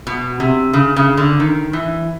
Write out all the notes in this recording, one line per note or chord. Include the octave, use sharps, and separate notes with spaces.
B2
C3
C#3
C#3
D3
D#3
E3